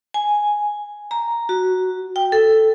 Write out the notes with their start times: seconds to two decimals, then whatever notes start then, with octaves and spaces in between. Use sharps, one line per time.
0.14 G#5
1.11 A#5
1.49 F#4
2.16 G5
2.32 A4